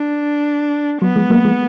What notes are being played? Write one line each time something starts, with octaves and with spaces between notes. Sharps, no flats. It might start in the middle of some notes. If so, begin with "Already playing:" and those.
Already playing: D4
F#3 B3
F3 G#3
F#3 A#3
F3 G#3